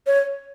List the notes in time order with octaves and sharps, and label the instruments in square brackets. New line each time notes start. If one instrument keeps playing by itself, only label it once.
[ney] C#5